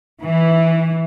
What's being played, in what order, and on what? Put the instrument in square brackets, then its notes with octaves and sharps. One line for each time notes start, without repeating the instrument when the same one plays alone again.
[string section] E3